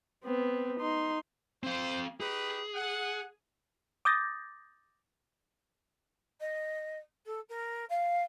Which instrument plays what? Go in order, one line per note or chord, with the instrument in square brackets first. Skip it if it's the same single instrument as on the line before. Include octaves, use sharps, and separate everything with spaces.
[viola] B3 C4
D#4 C6
[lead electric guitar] C4 F5 [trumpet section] C5
[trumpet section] D#4 G4 B4 [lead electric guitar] G#4
[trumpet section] F#5
[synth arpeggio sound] D6 D#6 G6 A6 A#6
[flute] D#5
A4
A#4
F5